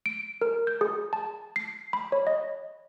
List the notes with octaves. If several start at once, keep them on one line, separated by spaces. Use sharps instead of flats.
D7
A#4
G6
G#4
A5
C7
B5
C#5
D#5